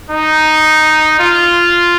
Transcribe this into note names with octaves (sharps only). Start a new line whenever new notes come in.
D#4
F4